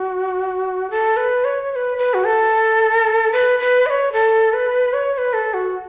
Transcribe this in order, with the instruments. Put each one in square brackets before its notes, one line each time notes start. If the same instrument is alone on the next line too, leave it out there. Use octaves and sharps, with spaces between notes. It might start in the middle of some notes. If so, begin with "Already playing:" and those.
Already playing: [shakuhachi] F#4
A4
B4
C#5
C#5
B4
B4
F#4
A4
B4
B4
D#5
C#5
A4
B4
C#5
C#5
B4
A4
F#4